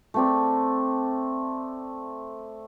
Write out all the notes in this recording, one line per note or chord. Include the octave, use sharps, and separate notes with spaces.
A3 C4 D5